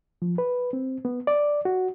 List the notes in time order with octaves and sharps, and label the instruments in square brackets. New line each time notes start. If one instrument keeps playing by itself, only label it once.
[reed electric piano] F3
B4
C4
B3
D5
F#4